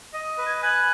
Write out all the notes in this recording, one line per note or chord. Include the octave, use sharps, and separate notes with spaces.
D#5
B4
G#6
G#5 F#6